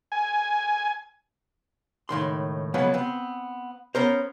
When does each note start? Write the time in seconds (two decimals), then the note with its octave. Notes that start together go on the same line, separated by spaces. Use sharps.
0.12 G#5
2.09 C#2 A2 D#3 C6
2.74 C#3 F3 F#3 G#3 A#3 B3
2.94 B3 C4
3.95 B3 C#4 A#4 C5